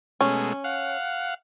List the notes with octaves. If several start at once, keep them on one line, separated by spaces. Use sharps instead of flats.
B2 G#3 A3 C#4
F5 F#5